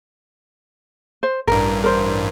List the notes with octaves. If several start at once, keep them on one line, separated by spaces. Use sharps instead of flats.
C5
A1 G2 A#4
A#4 C5